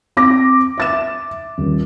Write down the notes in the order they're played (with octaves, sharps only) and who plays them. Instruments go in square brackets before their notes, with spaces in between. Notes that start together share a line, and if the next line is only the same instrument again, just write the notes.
[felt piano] C4 D6 A#6
E5 A6 E7
D#1